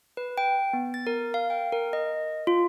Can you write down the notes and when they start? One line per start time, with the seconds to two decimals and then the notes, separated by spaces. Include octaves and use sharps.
0.17 B4
0.38 G5
0.73 B3
0.94 A6
1.07 A#4
1.34 F5
1.50 G5
1.72 A#4
1.93 D#5
2.47 F4